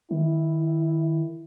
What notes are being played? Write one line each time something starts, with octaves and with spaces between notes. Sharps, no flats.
D#3 E4